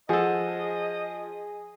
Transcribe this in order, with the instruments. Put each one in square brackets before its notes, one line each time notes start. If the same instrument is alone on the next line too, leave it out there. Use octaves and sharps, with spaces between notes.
[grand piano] F3 [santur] G#4 [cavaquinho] A4 F#5 [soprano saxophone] D#5